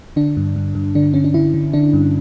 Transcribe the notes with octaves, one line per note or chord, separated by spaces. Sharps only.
D3 D4
G2
G2
G2
D3 D4
D3 C#4
D4
D3 E4
D3
D3 D4
G2